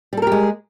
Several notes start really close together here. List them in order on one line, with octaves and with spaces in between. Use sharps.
G3 A4 A#4 G4 G#3